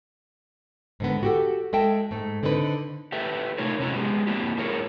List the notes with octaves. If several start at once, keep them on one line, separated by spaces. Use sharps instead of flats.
G#2 D3 B3
F#4 G4 A4
G#3 A4 E5 G5 A5
G#2 A3
D3 C4 D#4 G#4 B4
G4 A4 B4 E5
C3 A3 D#4 F4 A#4 C#5
C3 C#4 E4 F#4 B4 A#5
G#3 B3 G4 G#4
A#3 C4 D4 E4 G4
D4 E4 F4 G#4 A#4 C#5